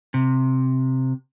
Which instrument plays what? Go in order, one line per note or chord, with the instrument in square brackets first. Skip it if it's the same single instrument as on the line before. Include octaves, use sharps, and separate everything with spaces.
[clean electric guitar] C3